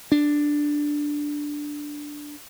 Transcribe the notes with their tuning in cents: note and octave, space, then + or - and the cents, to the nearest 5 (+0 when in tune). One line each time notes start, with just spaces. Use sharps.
D4 +0